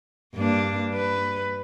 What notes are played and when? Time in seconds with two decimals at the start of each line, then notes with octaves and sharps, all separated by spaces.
0.34 G2 A#3 D4
0.94 B4